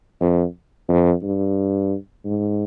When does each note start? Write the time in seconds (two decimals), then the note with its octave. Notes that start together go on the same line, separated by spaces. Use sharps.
0.21 F2
0.89 F2
1.23 G2
2.25 G#2